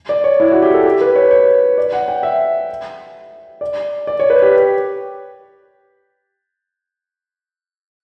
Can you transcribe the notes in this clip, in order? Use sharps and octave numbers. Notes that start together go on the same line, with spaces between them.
D5
C#5
E4
F#4
G4
A4
G4
B4
C#5
C#5
D5
F#5
G5
E5
D5
D5
C#5
B4
G4